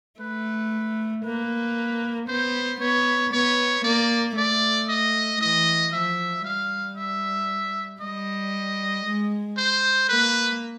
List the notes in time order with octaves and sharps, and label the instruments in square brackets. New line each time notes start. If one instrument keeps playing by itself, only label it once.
[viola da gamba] A3 [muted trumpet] B4
[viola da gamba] A#3 [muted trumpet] B4
[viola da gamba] B3 [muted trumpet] C5
[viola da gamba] B3 [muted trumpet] C#5
[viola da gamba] B3 [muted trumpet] C#5
[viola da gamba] A#3 [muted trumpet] D5
[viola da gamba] A3 [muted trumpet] D5
[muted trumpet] D#5
[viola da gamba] E3 [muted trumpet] D#5
[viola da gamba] F3 [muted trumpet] E5
[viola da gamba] G3 [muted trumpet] F5
[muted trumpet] E5
[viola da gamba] G3 [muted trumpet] D#5
[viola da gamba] G#3
[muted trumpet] C5
[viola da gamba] A#3 [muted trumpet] B4